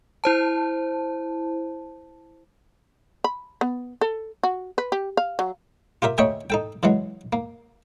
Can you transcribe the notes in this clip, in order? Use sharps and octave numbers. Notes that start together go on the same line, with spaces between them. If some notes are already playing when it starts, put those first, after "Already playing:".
E4 C5 A5
B5
B3
A4
F#4
B4
G4
F5
F#3
F4 G4 A#4 E5
D2 C#5 D#5 E5 G5 G#5
D#4 A4 G5
C#3 E3 F#3 G#3
A#3